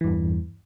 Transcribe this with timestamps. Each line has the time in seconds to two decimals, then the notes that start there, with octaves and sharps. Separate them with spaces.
0.01 E3
0.04 G2
0.08 E2